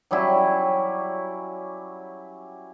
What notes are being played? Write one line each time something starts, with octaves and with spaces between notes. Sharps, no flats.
F#3 G3 C#4 E4